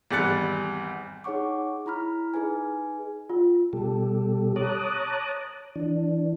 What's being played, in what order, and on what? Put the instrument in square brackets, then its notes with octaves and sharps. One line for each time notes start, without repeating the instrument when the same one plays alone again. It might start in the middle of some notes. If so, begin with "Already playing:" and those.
[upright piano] G#1 E2 G3 F#6 A6 C#7
[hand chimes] D#4 G#4 C#5 F#5 C#6 D6
E4 A#5 B5 F6
D#4 G#4 B4 G#5
[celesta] F4
[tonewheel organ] B2 G3 G4 A4
C#5 A5 A#5 D6 D#6 F#6
E3 D4